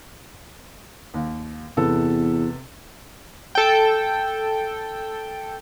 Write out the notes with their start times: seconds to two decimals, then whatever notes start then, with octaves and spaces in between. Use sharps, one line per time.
1.14 D#2
1.77 E2 C3 B3 A4
3.55 A4 G5